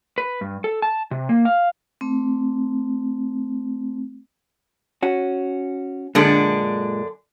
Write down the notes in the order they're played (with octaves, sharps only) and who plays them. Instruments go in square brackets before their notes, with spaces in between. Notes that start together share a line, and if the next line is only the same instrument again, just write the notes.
[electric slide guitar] B4
G2
A4
A5
C3
A#3
F5
[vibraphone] A3 C4
[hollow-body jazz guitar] C#4 F#4
[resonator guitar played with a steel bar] F#2 D3 D4 [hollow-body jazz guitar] A#2 G#3